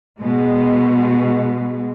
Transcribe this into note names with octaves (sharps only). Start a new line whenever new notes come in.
B2 G#3